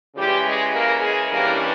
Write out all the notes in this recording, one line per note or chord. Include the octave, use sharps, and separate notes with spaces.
C#3 E3 G3 G#3 G4
G#3 G#4
A#3 A#4
G#3 G#4
G2 E3 G3 A#3 C#4 A#4